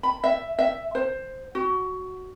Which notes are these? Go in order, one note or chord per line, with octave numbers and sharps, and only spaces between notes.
B5
E5
E5
C5
F#4